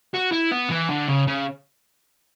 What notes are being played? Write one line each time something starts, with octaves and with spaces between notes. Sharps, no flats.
F#4
E4
B3
E3
D3
C#3
C#3